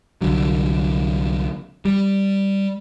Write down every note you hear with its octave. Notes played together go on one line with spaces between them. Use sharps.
C2 D3 F#3
G3